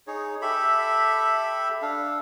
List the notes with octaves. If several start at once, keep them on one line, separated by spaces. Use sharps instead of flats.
D#4 G#4 C#5
G4 A4 E5 B5
D4 A4 F5